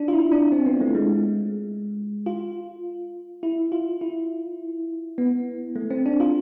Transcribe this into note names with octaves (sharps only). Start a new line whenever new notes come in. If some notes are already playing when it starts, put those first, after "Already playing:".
Already playing: D4
F4
E4
D4
C4
B3
A3
G#3
F4
E4
F4
E4
B3
A3
C4
D4
F4